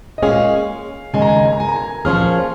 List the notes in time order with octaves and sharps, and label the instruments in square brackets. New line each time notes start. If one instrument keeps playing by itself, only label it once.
[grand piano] D#5
[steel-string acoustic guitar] A#2 G#3 C#4 G#4 [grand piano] F5
[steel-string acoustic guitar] D#2 C#3 G#3 [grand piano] G#5
[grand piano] A#5
G#5
A#5
G#5
A#5
G#5
A#5
G#5
[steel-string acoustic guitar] A#2 F3 C#4 F4 G#4 [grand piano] F6